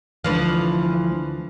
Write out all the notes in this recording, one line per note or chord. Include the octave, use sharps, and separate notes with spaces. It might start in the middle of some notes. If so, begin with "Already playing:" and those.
D2 E3 F3